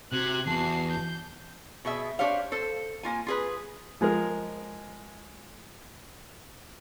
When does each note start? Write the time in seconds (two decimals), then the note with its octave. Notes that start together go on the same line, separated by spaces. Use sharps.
0.12 C3 F#4 F#6 G#6
0.47 E2 F#4 A5 C7
0.91 G6
1.85 B2 G#4 E5
2.19 D4 G4 C5 C#5 F5
2.52 A4 C5
3.03 A#3 F4 G#5
3.27 F4 G#4 B4
4.01 F3 G#3 G#4 A#4